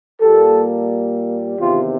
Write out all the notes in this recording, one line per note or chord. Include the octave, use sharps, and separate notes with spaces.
A#2 G3 A#3 G4 A4
E2 C3 D#3 F4 G4